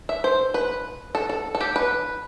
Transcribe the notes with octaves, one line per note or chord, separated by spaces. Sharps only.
E5
C5
B4
A4
A4
A4
G4
B4